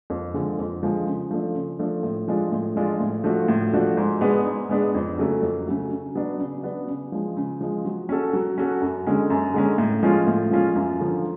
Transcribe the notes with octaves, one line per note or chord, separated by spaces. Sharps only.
F2
D3 F3 G#3
F2
D3 F3 G#3
C#3
F3 A3 D4
C#3
F3 A3 D4
A2
F3 G#3 D4 F4
A2
F3 G#3 D4 F4
A2
F3 A3 D4 F#4
A2
F3 A3 D4 F#4
G#2
G#3 B3 D4 G#4
G#2
G#3 B3 D4 G#4
F2
C#3 F#3 A3
F2
C#3 F#3 A3
C#3
F#3 B3 D4
C#3
F#3 B3 D4
C#3
F3 G#3
C#3
F3 G#3
F#3
C#4 F#4 A4
F#3
C#4 F#4 A4
F#2
D3 G#3 C#4
F#2
D3 G#3 C#4
A2
F3 G#3 C#4 F4
A2
F3 G#3 C#4 F4
F#2
D3 F3